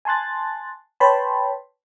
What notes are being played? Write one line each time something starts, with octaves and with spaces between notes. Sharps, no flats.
G#5 A5 C6 F#6 A6
B4 C#5 G5 A5 B5 C6